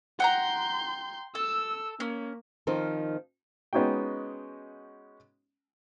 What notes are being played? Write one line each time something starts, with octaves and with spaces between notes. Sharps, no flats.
F#5 G5 A#5 C6 G6
A4 E6
A#3 C#4
D#3 F3 C4 D#4
G#3 B3 C#4 D#4 F#4 G5